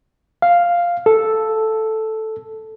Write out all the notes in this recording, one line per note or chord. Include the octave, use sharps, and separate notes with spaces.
F5
A4